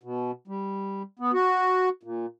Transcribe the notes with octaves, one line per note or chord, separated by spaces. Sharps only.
B2
G3
B3
F#4
A#2